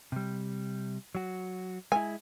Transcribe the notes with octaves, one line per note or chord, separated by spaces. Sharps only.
C3 G3
F#3 F#4
G#3 E4 G#5